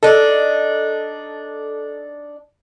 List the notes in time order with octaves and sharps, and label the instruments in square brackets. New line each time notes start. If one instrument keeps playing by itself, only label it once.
[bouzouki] D4 D#4 [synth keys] A4